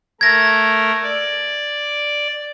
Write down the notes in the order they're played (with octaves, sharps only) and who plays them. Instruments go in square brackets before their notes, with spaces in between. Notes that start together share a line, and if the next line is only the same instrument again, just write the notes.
[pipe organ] A3 A#4 [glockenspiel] G#6 A#6
[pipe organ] D5